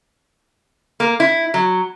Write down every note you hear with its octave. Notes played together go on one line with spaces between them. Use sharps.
A#3
E4
F#3